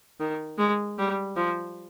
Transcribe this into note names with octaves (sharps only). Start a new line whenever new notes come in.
D#3
G#3
G3
F3